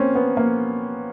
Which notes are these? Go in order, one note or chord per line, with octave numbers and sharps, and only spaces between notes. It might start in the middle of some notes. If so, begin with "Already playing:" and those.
Already playing: A#3 C4 C#4
B3
A#3